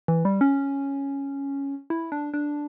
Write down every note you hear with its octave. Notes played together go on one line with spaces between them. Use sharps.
E3
G3
C#4
E4
D4
D4